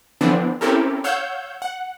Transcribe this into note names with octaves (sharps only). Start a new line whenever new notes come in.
D3 E3 F3 B3 C4 D4
C4 C#4 E4 G4 A4 A#4
C#5 F5 F#5 E6 G6
F#5